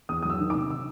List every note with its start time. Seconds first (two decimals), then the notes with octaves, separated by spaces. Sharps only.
0.09 E2 D#6
0.22 D#6
0.25 F#3 E6
0.40 D#3
0.50 D6
0.55 C3
0.70 E6